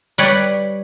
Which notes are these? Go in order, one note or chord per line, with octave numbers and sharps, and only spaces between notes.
G3 B4 C#5 D5